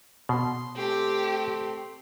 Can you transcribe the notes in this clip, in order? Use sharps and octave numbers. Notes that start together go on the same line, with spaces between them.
B2 C6
A3 C4 G4 C6